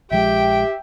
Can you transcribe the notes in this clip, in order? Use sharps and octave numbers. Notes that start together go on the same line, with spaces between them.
A#1 F3 G#3 G4 E5 G5